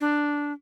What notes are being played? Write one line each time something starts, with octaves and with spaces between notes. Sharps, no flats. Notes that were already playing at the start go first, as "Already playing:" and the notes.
D4